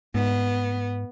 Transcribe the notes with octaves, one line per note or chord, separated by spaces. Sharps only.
G#2 B3